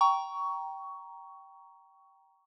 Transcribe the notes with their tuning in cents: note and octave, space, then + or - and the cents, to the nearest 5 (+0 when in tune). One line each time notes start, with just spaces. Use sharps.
G5 -10 A#5 +10 C#6 +15